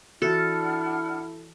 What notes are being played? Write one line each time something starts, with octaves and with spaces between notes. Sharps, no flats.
E3 D4 E4 F#4 A4 F#5 F6